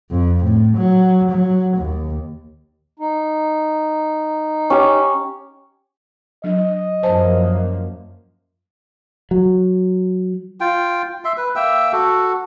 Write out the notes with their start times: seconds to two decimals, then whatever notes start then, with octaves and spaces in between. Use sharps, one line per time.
0.12 F2
0.45 A2
0.77 F#3
1.31 F#3
1.77 D#2
3.00 D#4
4.70 C#4 G4
6.44 F#3 D4 D#5
7.03 F#2 F3 A#3 C5 G#5 A5
9.31 F#3
10.60 F4 G5
11.25 E5 C6
11.37 B4
11.56 A#3 E5 G5 E6
11.92 F#4 A4